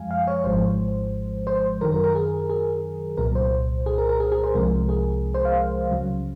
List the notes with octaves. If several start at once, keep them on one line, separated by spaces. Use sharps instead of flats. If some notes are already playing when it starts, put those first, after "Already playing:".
Already playing: F#2 F3 G#3 F5 G#5
F5
C#5
G#1 G#2 F3 G#3 C5
C5
F#2 D#3 F#3 A#4
A#4
A#4
G#4
G#4
C2 A#2 F#3 A#4
C5
G#4
A#4
A#4
G#4
G#4
C5
C2 C3 F3 G#3 A#4
G#4
C5
F5
C#2 C#3 F#3